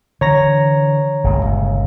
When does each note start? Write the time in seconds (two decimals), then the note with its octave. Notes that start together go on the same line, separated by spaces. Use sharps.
0.21 D3 E3 C#5 A#5 A#6
1.24 G1 C#2 A#2